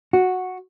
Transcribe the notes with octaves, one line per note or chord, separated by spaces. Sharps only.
F#4